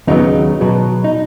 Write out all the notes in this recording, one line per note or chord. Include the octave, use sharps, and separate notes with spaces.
D#2 C#3 F#3 B3 D#4
B2 F#3 B3
D#4